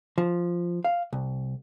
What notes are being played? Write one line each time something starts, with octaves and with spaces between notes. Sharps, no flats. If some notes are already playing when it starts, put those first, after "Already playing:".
F3
F5
C2